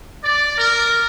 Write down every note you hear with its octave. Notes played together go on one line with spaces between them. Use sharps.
D5
A#4